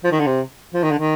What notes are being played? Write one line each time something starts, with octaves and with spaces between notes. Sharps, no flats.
F3
D#3
D3
C3
F3
D#3
D3
D#3